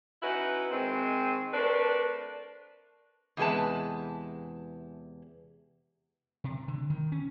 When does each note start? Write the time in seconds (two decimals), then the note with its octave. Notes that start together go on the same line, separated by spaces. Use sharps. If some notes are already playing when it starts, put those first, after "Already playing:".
0.22 C#4 D#4 E4 F#4 B4
0.71 D#3 G#3 C4
1.53 A3 C4 D4 A#4 B4
3.37 E2 C3 G#3 B4 A5
6.44 C3
6.68 D3
6.90 D#3
7.12 C#4